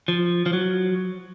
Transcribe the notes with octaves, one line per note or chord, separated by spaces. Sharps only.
F3
F3
F#3